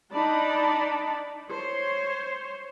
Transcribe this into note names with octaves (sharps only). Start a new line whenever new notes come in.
D4 D#4 D5 A5 B5
C5 C#5 C6